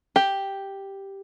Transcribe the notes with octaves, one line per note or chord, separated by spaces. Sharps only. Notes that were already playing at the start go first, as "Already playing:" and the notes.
G4